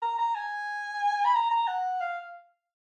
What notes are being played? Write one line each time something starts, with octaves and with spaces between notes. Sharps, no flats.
A#5
A#5
G#5
B5
A#5
A#5
F#5
F5